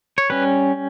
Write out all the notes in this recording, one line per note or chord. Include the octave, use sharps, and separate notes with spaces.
C#5
G3 C#4 B4